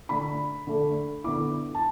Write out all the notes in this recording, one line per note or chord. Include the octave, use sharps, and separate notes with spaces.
D3 A3 D4 B5
D3 A3 D4
D3 B3 E4 D6
A5